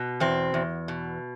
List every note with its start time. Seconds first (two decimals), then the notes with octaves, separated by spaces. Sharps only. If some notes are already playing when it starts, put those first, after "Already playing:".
Already playing: B2
0.20 E2 C4
0.54 E2
0.88 B2